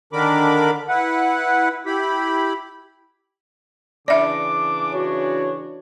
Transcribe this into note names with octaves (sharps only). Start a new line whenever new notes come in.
D3 D#3 D4 A#4 B5 D6
E4 B4 F#5
E4 G4 B5
C#3 E3 D4 D5 E5 D6
F#4 C#5